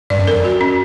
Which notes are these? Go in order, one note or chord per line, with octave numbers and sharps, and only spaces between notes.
G2 D5
F#2
F2 A#4
F#2
F#4
C#4